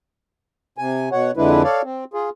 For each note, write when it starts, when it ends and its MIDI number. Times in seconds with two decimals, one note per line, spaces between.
0.78 1.09 48
0.78 1.09 80
1.12 1.31 47
1.12 1.31 73
1.12 1.31 78
1.37 1.63 41
1.37 1.63 50
1.37 1.63 56
1.37 1.63 62
1.37 1.63 64
1.37 1.63 71
1.64 1.82 69
1.64 1.82 73
1.64 1.82 74
1.64 1.82 77
1.84 2.04 60
2.14 2.30 65
2.14 2.30 68